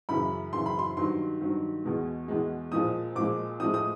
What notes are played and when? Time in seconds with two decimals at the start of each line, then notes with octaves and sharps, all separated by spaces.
0.09 F#2 C#3 E3 B5
0.53 F#2 C#3 E3 C6
0.66 B5
0.79 C6
0.97 G2 D#3 F#3 C6
1.40 G2 D#3 F#3
1.84 E2 B2 G#3
2.28 E2 B2 G#3
2.72 A#2 F3 G#3 D#6
3.15 A#2 F3 G#3 D6
3.60 A2 F3 G#3 D#6
3.74 D#6